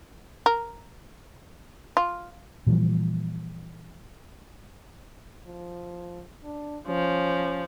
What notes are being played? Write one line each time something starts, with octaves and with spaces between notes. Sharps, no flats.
A#4
F4
A#2 E3 F3 G3
F3
D4
F3 C#4